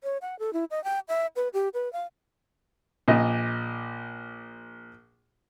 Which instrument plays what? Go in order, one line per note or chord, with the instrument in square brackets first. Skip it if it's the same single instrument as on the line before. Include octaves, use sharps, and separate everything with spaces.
[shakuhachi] C#5
F#5
A4
E4
D#5
G5
E5
B4
G4
B4
F5
[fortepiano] A#1 A#2 D#5